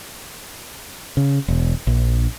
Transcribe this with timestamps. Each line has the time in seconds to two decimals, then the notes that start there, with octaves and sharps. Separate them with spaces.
1.17 C#3
1.48 E1
1.87 A#1